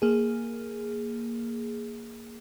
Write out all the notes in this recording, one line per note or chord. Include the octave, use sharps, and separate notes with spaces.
A#3 G#4